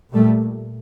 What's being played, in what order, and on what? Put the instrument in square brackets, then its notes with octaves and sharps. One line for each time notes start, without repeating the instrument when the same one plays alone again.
[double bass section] A#2 G3 A3